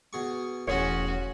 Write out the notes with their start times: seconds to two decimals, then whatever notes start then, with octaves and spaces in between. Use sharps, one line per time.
0.13 B2 G#4 C#6
0.67 E1 A1 C#4 F#4 G#4 C#5 C6